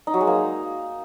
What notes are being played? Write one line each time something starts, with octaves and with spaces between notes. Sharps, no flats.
D#4
F#3
G#3
A#3